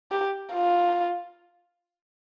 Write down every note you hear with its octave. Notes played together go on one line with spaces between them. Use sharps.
G4
F4